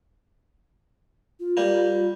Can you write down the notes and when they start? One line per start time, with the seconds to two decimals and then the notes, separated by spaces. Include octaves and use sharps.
1.40 F4
1.57 G3 A#3